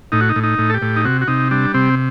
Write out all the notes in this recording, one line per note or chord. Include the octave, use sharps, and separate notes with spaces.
A2 D#4
F#4
D#4
A2
D#4
A2
A4
G4
A2
D#4
C3 F#4
F#4
C3 D#4
G3 D4
C3 C4